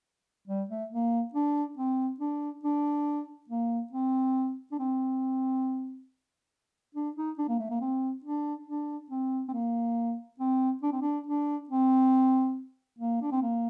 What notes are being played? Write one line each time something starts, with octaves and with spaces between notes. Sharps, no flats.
G3
A3
A#3
D4
C4
D4
D4
A#3
C4
D4
C4
D4
D#4
D4
A#3
A3
A#3
C4
D4
D4
C4
C4
A#3
C4
D4
C4
D4
D4
C4
A#3
D4
C4
A#3